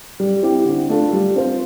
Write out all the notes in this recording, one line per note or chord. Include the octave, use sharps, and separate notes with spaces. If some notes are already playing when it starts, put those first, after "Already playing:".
G3
C4 E4 G4
D3
A3 D4 F4 A4
G3
C4 F4 C5